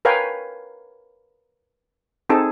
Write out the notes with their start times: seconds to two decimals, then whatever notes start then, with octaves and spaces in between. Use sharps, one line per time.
0.05 A#4 B4 C#5 F5 G5 G#5
2.29 C4 D#4 G#4 A4 A5